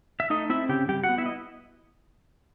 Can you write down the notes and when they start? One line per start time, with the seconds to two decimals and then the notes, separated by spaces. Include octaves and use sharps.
0.20 E5
0.30 A3 D#4 D#5
0.50 C4 E4 E5
0.69 C#3 G4 G5
0.89 G3 G4 G5
1.03 F#4 F#5
1.09 B3
1.18 E4 E5
1.26 D#5